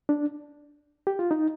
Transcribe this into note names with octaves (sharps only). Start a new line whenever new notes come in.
D4
G4
F4
D#4